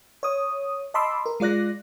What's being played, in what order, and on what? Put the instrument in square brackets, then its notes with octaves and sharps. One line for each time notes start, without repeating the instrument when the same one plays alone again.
[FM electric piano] C#5 D#6
D#5 A5 B5 C6 D6 E6
A#4
G#3 F4 D5 F#6 A#6